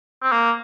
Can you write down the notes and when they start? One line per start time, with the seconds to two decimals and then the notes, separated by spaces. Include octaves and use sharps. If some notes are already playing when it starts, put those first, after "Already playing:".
0.23 C4
0.32 A#3